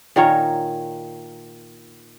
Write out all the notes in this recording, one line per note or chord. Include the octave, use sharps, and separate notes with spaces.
A#2 D#3 A#4 C#5